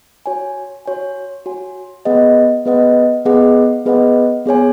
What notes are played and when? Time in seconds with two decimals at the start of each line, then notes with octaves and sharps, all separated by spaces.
0.26 F#4 C#5 G#5
0.86 F#4 C#5 G#5
1.46 F#4 C#5 G#5
2.05 B3 G#4 B4 D#5 F#5
2.65 B3 G#4 B4 D#5 F#5
3.26 B3 G#4 B4 D#5 F#5
3.86 B3 G#4 B4 D#5 F#5
4.46 B3 G#4 C#5 G#5